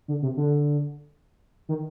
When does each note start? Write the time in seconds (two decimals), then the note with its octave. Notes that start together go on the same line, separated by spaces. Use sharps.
0.08 D3
0.23 C3
0.37 D3
1.69 D#3